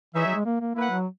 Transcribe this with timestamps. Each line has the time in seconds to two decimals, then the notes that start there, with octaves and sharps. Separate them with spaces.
0.14 E3 D#4 G#4 C#5 E5
0.26 F#3
0.35 G#3
0.45 A#3
0.60 A#3
0.75 A#3 E4 B4 F#5
0.90 F#3